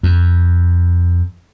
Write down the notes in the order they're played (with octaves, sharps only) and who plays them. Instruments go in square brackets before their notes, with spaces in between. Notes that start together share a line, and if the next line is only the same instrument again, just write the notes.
[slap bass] F2